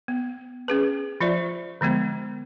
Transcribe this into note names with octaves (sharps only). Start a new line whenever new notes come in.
B3
C#4 G#4 B4
F3 F4 C5 D5 E5
D3 F3 G#3 B3